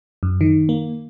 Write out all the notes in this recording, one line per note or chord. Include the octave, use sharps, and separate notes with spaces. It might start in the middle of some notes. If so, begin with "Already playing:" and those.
F#2
D#3
A#3